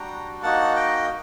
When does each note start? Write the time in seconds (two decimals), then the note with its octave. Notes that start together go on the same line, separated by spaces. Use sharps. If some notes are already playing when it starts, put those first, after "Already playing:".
Already playing: G3 D4 F#4 G5 A#5
0.42 A#3 D#4 F#4 F#5 A5
0.76 D#5 G5